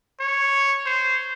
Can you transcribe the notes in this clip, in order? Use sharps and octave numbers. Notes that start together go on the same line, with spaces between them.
C#5
C5